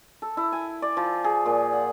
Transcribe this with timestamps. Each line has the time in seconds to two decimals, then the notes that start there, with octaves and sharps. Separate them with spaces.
0.22 A4
0.37 E4
0.52 G#5
0.82 D5
0.97 F3
1.24 G#4
1.46 A#2
1.73 F#5